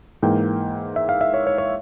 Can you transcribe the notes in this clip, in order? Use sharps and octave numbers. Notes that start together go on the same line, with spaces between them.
G#2 E3 A#3 G5
E5
F5
E5
C#5
C#5
C#5